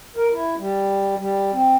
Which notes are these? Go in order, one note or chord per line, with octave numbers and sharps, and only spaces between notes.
A#4
E4
G3
G3
C4